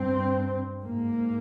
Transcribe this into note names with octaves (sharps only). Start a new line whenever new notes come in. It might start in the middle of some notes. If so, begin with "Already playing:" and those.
Already playing: G2 C4
G#2 A#3